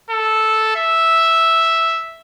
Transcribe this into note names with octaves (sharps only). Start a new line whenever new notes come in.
A4
E5